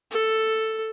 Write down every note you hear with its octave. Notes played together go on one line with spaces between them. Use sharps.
A4